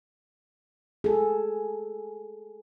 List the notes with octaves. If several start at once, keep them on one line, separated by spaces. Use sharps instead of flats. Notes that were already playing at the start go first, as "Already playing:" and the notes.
G#4 A4